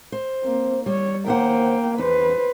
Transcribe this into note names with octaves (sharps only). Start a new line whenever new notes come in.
C5
A#3 C4
G3 C#5
D#2 A#3 C5 F#5 G5
E2 B4 C5